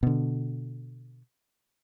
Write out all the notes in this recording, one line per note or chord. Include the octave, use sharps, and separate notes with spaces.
B2 D3